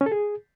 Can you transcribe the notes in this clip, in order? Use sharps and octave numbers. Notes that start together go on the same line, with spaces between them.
C#4
A4
G#4